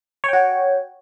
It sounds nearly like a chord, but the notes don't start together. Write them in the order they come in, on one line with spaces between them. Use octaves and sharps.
C#5 G5 F#4